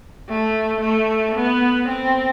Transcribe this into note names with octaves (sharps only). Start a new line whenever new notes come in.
A3
A3
B3
C4